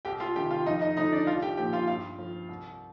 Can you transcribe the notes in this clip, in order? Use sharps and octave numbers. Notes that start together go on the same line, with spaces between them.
C2 G4 G5
F4 F5
C3 D#3 G4 G5
F4 F5
F2 D#4 D#5
D#4 D#5
D3 F3 D#4 D#5
D4 D5
C2 F4 F5
G4 G5
A#2 F3 G4 G5
F4 F5
G2 F4 F5
F3
C2